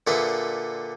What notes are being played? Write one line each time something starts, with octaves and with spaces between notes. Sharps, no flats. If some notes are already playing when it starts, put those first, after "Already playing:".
A#2 D3 G#4 B4 C5 E5